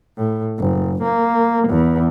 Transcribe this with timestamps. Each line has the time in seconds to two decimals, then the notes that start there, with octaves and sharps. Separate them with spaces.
0.17 A2
0.59 F#1
1.03 A#3
1.69 E2